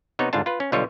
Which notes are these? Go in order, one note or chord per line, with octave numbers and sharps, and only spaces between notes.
C3 B3 D#4 C#5
G1 C#2 G#2 D4 F4 A5
F4 B4
C#4
B1 D3 G3 F4 C#5 D#5